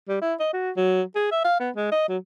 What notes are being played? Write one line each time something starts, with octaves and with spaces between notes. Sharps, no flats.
G3
E4
D#5
F#4
F#3
G#4
E5
F5
B3
G#3
D#5
F#3